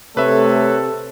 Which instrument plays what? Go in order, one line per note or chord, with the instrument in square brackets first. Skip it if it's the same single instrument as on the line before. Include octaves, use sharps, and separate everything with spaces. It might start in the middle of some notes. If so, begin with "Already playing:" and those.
[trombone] C3 [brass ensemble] A3 C#5 [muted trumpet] A4 [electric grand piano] B4 E5